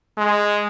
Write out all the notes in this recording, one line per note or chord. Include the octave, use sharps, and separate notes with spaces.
G#3